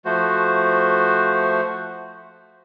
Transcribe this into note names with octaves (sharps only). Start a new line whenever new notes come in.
F3 A3 F#4 C5